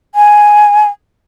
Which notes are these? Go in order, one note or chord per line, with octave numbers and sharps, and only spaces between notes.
G#5